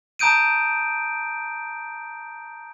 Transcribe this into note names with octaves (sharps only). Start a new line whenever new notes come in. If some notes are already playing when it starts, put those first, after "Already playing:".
A5 A#5 D#6 G6 D7 D#7